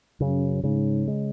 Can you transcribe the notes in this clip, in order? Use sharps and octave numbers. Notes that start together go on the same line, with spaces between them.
F#2 C#3
G#2 C#3
G#3